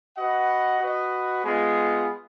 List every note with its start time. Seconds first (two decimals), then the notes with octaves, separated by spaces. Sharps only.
0.17 F#4 B4 D#5 F#5
0.80 F#4 B4 D#5
1.44 G#3 B3 F4 G#4